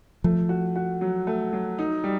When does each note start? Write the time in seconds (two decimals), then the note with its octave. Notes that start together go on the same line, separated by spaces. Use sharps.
0.24 F3 A3
0.49 F#4
0.76 F#4
1.01 F#3
1.27 A3
1.53 F#3
1.79 D#4
2.04 G3